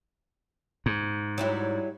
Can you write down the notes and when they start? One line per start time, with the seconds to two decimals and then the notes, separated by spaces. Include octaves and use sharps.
0.86 G#2
1.38 F#3 G3 E4